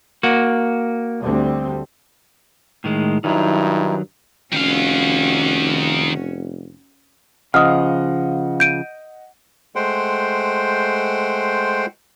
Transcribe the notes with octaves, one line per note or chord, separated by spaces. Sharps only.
A#3 F#4
D2 G3 C4
A2 D#3 G#3
G2 D#3 F#3 D#4 E4
F1 D#3 C#4 F#4 F5
C#3 F3 D#5 F#5 D#6 F6
G6 D7 D#7
G#3 A3 C5 F#5 G5 C6